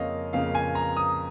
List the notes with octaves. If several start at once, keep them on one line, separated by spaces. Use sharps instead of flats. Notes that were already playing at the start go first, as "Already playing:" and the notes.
Already playing: F2 C#3 A#3 C#5 D#5 F5
F2 C#3 A#3 F5
G#5
A#5
D#6